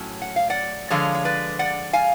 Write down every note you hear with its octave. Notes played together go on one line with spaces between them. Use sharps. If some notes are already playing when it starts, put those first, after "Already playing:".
Already playing: A2 F#3 C#4
F#5
F5
D5 F#5
D3 F3 G#3 C#5 F5
C#5
B4 D5
D5 F#5
F5 G#5